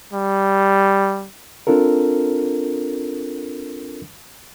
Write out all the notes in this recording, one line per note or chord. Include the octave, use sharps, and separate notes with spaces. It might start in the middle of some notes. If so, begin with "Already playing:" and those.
G3
C4 D4 F4 A4 A#4